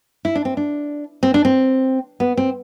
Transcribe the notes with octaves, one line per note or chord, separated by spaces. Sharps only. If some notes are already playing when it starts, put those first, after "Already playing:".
E4
D4
C4
D4
C4
D4
C4
B3
C4